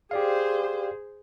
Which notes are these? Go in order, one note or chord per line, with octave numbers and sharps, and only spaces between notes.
G4 G#4 C5 D5 F5